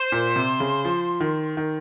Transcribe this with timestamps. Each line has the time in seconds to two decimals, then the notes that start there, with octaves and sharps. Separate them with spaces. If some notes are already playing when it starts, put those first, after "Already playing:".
Already playing: C5
0.12 A#2
0.36 C3
0.60 C#3
0.85 F3
1.20 D#3
1.57 D#3